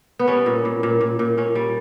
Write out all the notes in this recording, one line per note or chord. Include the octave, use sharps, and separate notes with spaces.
B3
G3 C#4
A#2
A#2
A#2
A#2
A#2
A#2 C#4
G3